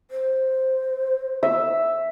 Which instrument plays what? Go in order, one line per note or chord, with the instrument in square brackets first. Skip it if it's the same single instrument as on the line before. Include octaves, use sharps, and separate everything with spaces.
[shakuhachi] C5
[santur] E5